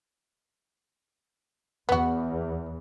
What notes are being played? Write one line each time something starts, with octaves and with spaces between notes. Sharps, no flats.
E2 B3 F#4